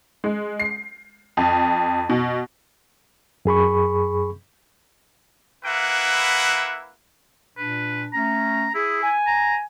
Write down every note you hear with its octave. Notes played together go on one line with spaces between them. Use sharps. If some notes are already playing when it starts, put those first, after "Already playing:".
G#3
C7
F2
B2
F#2 G#4 B5 C#6
A#3 E4 B4 E5 F#5
A#2 D4 B4
A3 C#4 A#5
E4 G#4
G#5
A#5